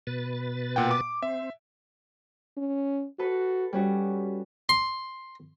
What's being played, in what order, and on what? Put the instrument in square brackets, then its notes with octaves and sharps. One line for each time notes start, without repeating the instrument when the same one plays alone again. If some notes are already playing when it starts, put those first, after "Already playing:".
[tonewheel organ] B2 B4 A6
[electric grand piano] A#2 F#5 G5
D6
[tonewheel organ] C4 [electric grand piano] E5
[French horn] C#4
[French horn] F#4 [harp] A4 B4
[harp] G3 C#4 F#4 [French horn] G4
[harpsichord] C6